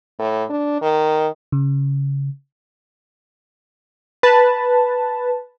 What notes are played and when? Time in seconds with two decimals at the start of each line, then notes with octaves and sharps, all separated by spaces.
0.19 A2
0.50 D4
0.82 D#3
1.52 C#3
4.23 B4 A5